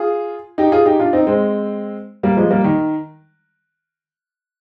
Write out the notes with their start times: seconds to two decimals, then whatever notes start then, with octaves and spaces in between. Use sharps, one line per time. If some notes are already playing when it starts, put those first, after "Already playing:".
Already playing: F4 G#4
0.58 D#4 G4
0.72 F4 G#4
0.86 D#4 G4
0.99 D4 F4
1.13 C4 D#4
1.27 G#3 C4
2.23 G3 A#3
2.37 F3 G#3
2.51 G3 A#3
2.64 D#3